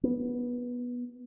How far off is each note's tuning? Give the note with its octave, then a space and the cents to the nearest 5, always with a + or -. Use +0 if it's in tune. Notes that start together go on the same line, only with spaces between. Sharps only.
B3 -15